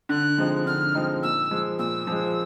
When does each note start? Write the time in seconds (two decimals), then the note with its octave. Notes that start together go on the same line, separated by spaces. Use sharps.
0.09 D3 F#6
0.38 F3 G#3 C4 D#4
0.66 D3 F6
0.95 F3 G#3 C4 D#4
1.23 A#2 E6
1.51 F3 G#3
1.79 A#2 E6
2.07 F3 G#3